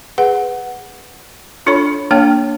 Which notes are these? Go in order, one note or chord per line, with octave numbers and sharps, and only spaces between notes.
G#4 B4 F#5
D4 F4 A4 C#5 B5 C#6
A#3 D4 C#5 G5